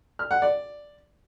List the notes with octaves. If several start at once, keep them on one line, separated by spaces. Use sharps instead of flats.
F6
F#5
D5